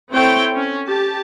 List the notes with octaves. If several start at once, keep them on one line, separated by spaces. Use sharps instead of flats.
C4 E4 A4 C5 C#5 G5
C#4
G4 A5